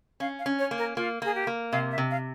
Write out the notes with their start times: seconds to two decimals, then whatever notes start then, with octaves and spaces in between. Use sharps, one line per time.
0.20 C#4 F5
0.39 F5
0.46 C#4
0.59 C#5
0.71 A#3
0.78 A#4
0.96 A#3 F4
1.22 A#3 G#4
1.35 G4
1.47 A#3
1.72 C3 F5
1.91 E5
1.98 C3
2.11 F5